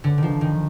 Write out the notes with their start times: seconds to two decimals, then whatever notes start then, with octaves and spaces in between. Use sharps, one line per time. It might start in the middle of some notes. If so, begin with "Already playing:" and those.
0.04 D3
0.18 D#3 F3
0.41 D#3